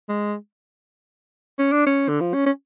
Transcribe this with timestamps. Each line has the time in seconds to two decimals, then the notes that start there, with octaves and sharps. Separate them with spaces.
0.09 G#3
1.59 C#4
1.72 D4
1.87 C#4
2.09 D3
2.21 F3
2.34 C#4
2.46 C#4